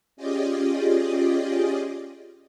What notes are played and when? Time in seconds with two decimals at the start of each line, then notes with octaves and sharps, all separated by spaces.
0.17 C#4 F4 G4 G#4 D5 D#5